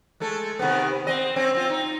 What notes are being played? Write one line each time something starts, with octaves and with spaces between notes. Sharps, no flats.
G#3 A3 A4
C3 D#3 B3
C4 D#5
C4 C#4
C4 F4
D#4